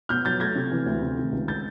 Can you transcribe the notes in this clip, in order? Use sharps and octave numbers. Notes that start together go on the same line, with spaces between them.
B2 F6 G6
F#3 G6 A6
A3 G#6 A#6
C3
E3
D2
C3
D#3
C#2
G6 A6